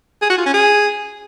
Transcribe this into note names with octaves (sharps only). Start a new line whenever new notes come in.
G#4
F#4
F4
C#4
G#4